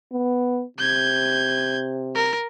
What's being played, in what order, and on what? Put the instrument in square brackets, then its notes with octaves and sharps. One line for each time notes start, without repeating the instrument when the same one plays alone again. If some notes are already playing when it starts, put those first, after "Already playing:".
[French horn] B3
[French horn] C3 [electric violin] G6 G#6
[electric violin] A#4